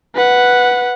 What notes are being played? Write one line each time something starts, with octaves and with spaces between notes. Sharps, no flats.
B4 F#5